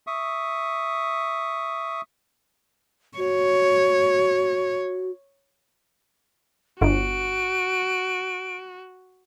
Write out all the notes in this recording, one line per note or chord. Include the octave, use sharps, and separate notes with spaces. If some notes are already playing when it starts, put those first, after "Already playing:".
E5 C#6 D#6
F#4 C#5
G1 F#4 D7